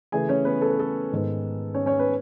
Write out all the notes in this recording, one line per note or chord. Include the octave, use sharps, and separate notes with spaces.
C#3 E3 A3 E4 G#4 G#5
C#4 C#5
B3 B4
A4
B4
A4
G#2 D#3 G#3 B3
C#4 C#5
C#4 C#5
B3 B4